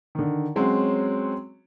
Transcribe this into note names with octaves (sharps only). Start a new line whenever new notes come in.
D3 D#3
F#3 G#3 C4 C#4 F#4